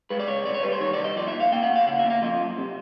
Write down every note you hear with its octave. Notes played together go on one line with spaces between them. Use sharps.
G#3 B4
D5
C#2 C#5
C3 D5
C#5
G3 B4
C5
D#3 C#5
D5
C2
D#5
F3 D5
E5
A#2
F5
A#3 G5
F#5
A#2
F5
C#3 F#5
E5
A#3
F5
F3 D#5
F#2
C3